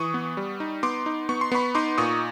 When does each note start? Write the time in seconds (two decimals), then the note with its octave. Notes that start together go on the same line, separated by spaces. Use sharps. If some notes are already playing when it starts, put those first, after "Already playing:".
Already playing: E3 C#6 D#6
0.14 B3
0.37 G3
0.60 D#4
0.83 B3 C6 D6
1.06 D#4
1.29 B3 C#6
1.41 C6
1.52 B3 B5 C#6
1.75 D#4 C6 D6
1.98 A#2 C#6 D#6